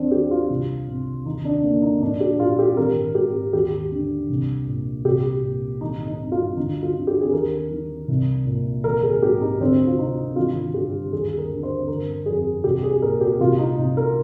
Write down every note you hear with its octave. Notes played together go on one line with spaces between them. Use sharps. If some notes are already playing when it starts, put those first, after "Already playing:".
Already playing: D#2 C4 D4
D#3 G4
F4
C2
C3
D#2 D#4
D4
D3 A#3
D#4
A#1 D4
G4
A#2 F4
G4
G#1 A#4
G#2 G4
D#2 G4
D3
C2
A#2
C2 G4
A#2
G#1 D#4
D#4
G2
F4
D2 D#4
F4
D3
G4
G#4
D#2 A#4
D#3
C2
A#2
G#1 A#4
G#4
G#2 G4
D#4
D2 C4
F4
C3 D#4
G#1 F4
G2 G4
D#2 G#4
A#4
D3
C5
G1 A#4
F2 G#4
C2 G4
G#4
A#2 A#4
G4
C2 F4
D#4
C3 D#4
A#4